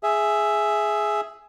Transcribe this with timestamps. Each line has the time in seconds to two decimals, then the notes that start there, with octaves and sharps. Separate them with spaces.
0.03 G#4 E5